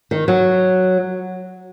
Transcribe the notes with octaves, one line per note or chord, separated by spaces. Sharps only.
D#3
F#3